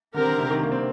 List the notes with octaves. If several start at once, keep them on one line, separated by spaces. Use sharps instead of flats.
D3 C4 G4 A#4
D3
C3
D#3
A#3
C4